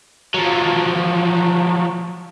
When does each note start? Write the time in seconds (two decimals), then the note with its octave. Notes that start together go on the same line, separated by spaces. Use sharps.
0.34 F3 F#3